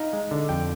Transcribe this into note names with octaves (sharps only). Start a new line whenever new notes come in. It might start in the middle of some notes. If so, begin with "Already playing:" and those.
Already playing: D#4 F5
G#3
D3
F2 G5